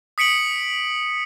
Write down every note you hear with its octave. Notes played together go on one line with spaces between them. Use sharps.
D#6 B6 C#7 D7 F#7